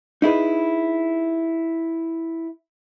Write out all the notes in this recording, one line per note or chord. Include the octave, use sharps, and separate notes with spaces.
D#4 E4 G#4 B4